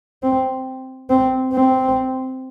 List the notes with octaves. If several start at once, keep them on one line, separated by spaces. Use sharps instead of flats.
C4
C4
C4